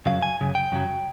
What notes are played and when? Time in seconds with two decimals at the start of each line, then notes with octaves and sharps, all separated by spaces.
0.06 F#2 C#3 F#3 F5
0.22 G#5
0.41 F#2 C#3
0.55 G5
0.72 F#2 C#3 F#3